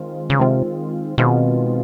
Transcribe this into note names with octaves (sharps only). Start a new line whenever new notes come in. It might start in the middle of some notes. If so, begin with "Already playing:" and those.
Already playing: D#3 G#3 C4 F4
C#3
C3 D#3 G#3 C4 F4
B2 D#3 G#3 C4 F4